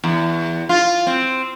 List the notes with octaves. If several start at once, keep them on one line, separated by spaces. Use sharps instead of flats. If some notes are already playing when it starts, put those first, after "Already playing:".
E2
F4
C4